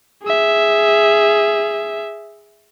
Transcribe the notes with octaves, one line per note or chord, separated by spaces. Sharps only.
G#4 E5